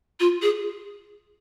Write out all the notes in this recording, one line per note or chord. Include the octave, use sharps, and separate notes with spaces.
F4
G#4